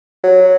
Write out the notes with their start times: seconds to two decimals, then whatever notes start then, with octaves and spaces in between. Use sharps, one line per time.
0.23 F#3